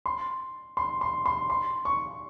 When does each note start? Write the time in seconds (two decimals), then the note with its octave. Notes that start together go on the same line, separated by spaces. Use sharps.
0.06 C6
0.77 C6
1.01 C6
1.26 C6
1.50 C6
1.85 C#6